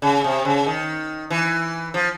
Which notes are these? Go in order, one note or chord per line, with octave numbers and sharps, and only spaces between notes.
C#3
C3
C#3
D#3
E3
F3